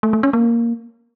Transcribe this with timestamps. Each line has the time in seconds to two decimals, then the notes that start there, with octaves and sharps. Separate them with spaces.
0.03 A3
0.13 A3
0.23 C#4
0.33 A#3